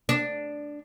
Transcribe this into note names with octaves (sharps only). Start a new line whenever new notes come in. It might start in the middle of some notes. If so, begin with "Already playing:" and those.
D4